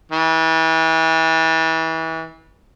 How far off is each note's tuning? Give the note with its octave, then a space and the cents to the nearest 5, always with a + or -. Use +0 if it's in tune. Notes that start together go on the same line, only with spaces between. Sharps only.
E3 -30